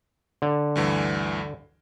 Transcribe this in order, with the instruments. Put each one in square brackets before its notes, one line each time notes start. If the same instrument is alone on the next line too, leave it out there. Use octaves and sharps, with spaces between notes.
[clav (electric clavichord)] D3
[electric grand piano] D2 G2 E3